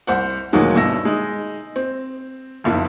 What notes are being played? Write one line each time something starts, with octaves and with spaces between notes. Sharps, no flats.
C2 C5 F#5
D2 A#2 D#3 F#3 G#3 A#3
G2 B2 E4 E6 A#6
G#3 D#4
C4
F#1 B1 F2 E4